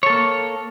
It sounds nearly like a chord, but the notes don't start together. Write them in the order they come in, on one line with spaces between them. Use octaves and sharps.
C#5 A4 A#3